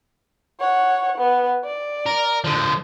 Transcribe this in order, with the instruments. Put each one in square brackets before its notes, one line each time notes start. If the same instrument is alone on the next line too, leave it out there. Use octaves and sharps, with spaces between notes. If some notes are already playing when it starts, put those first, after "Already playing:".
[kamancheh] C#5 F#5
B3
D5
[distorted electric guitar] A#4
D3 F3